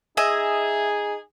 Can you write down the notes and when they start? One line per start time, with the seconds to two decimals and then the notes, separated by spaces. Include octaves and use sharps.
0.17 D#4 G#4 D#5 E5 G#5